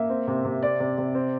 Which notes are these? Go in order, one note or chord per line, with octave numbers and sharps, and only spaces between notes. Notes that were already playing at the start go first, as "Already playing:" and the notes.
Already playing: A#3 E5
C4
C3
C3
C4 D5
C3
C3
C4